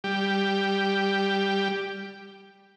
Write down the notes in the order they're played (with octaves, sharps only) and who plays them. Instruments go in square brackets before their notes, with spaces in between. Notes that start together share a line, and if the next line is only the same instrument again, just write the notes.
[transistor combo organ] G3 G4